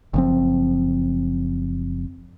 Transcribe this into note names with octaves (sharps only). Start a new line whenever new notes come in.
F#1 F3 C4